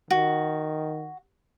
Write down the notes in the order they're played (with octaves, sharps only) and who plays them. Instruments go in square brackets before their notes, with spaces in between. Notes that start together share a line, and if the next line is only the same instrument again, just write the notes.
[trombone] D#3 [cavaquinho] F#4